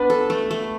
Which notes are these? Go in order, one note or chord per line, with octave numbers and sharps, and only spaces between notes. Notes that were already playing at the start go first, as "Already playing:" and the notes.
Already playing: B3 D4 B4
A4
A3
A3